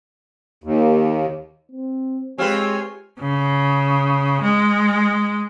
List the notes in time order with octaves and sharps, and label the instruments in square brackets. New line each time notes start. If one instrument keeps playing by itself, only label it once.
[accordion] D#2
[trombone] C4
[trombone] G#3 [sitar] C4 F4 B4 [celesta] G4 F6 [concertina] C#5 G#5
[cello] C#3
G#3